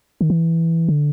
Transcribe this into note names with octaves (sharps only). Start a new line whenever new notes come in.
D#3
E3
D3